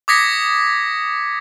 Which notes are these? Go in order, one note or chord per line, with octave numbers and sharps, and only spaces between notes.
D6 D#6 G#6 A#6 B6 C#7